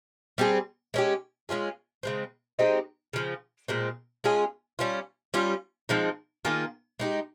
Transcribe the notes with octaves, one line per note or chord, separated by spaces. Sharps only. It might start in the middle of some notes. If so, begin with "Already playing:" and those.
G3 C4 F4 G#4
G#3 C#4 G4
G#3 C#4 F4 G#4
C#3 G#3 C4
G#3 C4 D#4 G4
C#3 F3 C4
A#2 G#3 C4
G#3 C#4 F4 G#4
G3 C#4 F4
G3 C#4 F4
F3 G#3 C4 D#4
D#3 A#3 F4 G#4
G#3 D#4 G4